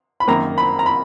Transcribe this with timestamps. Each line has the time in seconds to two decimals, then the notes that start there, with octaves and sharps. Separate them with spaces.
0.20 B5
0.28 F#2 D#3 A#3 A#5
0.58 B5
0.79 A#5
0.86 B5